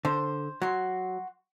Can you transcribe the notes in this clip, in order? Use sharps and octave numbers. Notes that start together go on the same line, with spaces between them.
D3 C5
F#3 F#4 C6